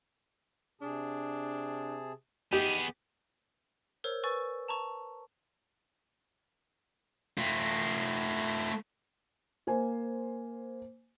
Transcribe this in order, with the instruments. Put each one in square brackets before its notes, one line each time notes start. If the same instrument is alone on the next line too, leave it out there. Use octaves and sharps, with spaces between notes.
[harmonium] C3 G#4 A5 [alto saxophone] D4
[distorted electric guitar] B3 G#4 [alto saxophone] D#4 [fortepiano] G4
[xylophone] A#4 C5 C#5 E6
B4 G#5 C#6 E6 A6
A5 A#5 C#6
[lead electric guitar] A3 F4
[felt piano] A#3 C5 G#5